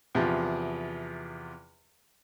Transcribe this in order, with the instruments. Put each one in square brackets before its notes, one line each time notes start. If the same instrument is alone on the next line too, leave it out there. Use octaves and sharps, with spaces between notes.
[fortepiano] E2 C3 F3